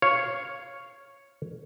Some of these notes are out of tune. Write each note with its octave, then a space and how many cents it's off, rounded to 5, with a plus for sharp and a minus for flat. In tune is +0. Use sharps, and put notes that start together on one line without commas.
C#5 +0 F5 +0